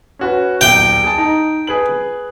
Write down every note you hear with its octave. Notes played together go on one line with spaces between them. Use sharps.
C#4 F#4 B4
D#1 B1 G5
G#4 A5
D#4
G#4 B4 F#7